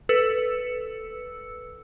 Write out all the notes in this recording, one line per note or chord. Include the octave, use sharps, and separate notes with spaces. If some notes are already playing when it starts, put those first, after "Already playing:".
A4 B4 E6 C#7